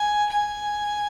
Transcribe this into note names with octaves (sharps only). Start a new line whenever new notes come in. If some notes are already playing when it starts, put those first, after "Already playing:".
Already playing: G#5
G#5